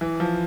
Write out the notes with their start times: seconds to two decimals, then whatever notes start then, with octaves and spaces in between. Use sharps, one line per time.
0.01 E3
0.20 F3